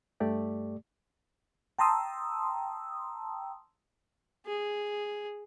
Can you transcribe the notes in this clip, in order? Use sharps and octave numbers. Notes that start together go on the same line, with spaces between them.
G2 A3 G4 D5
G5 A5 A#5 C6 D#6 E6
G#4